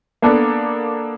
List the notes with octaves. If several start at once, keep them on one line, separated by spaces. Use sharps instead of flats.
A#3 B3 D4 A4